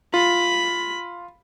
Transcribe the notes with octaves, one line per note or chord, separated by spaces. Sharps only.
F4 B5